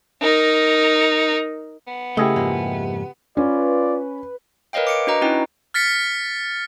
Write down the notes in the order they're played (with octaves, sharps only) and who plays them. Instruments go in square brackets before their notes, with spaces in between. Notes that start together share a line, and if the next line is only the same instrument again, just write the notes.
[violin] D#4 A#4
[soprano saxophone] B3
[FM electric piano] C#3 G4 [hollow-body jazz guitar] A3 [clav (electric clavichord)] E4 G#4 D#5
[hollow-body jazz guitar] F2 G#2 A#3
[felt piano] C#4 [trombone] F4 [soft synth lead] B4 [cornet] D5
[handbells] A#4 B4 C#5 D#5 F5 G5
D6 C#7 D7
D4 F#4 B4 D#5 A#5
C#4 D#4 E4 F#4 G5
[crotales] F6 A6 B6 C#7